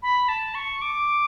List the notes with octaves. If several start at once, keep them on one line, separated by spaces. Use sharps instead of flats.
B5
A5
C#6
D6